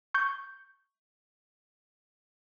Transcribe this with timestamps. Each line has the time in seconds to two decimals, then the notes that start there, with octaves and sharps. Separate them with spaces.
0.14 C#6 G6